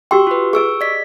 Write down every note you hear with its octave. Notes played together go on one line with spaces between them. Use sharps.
F#4 G4 G5 C6 C#6 E6
F4 B4
G#4 B4 C#6 E6 D7
D5 D#5 B6